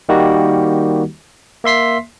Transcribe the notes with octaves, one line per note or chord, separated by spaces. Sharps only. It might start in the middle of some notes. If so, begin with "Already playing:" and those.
D#3 G3 A#3 D#4 F#4 G4
A#3 E5 C6 B6 C7